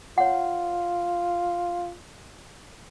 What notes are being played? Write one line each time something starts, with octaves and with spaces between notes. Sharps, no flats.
F4 C#5 F#5